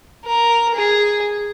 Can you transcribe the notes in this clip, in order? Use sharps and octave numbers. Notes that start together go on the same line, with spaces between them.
A#4
G#4